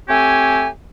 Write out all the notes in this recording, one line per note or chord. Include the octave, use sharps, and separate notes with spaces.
A3 C4 G4 C#5 G#5